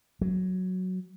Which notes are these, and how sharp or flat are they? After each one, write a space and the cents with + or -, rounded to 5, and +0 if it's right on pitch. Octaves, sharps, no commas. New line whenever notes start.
F#3 +0